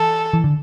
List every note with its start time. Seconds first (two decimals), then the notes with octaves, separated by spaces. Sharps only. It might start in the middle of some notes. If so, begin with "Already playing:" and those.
Already playing: E3 A4
0.33 E3
0.44 D3